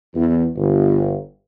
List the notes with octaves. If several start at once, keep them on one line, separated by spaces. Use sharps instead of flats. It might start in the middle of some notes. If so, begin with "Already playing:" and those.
E2
G1